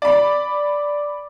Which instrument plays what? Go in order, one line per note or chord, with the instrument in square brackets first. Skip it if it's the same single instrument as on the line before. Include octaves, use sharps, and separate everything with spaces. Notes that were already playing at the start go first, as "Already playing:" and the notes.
[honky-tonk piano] D5 B5